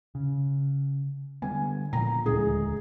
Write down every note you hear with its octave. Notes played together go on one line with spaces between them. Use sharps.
C#3
D3 G3 B3 G#5
A#2 F3 A#5
D#1 D2 G#3 G#4